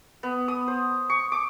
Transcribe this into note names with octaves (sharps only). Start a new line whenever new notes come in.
B3
D#6
C5
C#6
D6